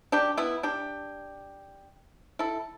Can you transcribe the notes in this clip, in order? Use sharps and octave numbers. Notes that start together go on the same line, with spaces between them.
D4 G4
B3 E4
D4 G4
E4 A4